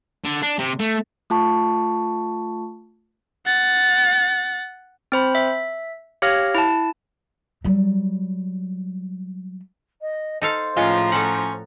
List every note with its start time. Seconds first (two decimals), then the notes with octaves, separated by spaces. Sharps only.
0.25 D3
0.43 D4
0.59 C3
0.80 A3
1.30 A3 F4 A5 C#6
3.45 F#5 A6
5.12 C4 C5 B5
5.35 E5
6.22 G4 C#5 F5 F6 A#6
6.55 E4 A5
7.64 F#3 G3
10.01 D#5
10.42 D#4 A4 C5 F5
10.76 A2 F3 G#3 C#4 F4 A#5
11.12 C#4 A4 F#5